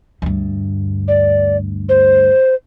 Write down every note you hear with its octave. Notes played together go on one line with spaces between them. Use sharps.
D2 G2
D5
C5